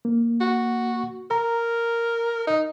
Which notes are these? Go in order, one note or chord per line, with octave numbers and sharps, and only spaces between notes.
A#3
F#4
A#4 A#5
D#4